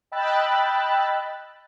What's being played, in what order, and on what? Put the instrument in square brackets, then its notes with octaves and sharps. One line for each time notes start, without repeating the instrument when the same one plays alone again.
[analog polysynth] D#5 G5 B5 E6 F#6 A6